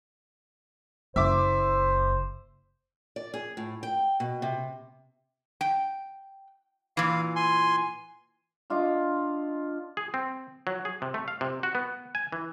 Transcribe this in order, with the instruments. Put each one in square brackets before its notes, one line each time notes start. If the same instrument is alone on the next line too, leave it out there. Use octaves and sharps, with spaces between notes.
[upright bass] F#1 [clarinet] C5 [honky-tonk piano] E5 D6
[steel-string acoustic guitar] D5
G#4
A2
G5
B2
C3
[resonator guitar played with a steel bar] G5
[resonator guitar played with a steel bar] A#2 E3 [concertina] F5
[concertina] G#5 C6
[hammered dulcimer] D4 F4 D#5 D6
[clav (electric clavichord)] G#4
C4
F#3
G#4
C3
A3
F5
C3
F#4
B3
G#5
E3